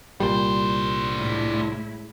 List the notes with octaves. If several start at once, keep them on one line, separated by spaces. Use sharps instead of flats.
C2 A#2 G3 D4 C5
A2 G#3 E4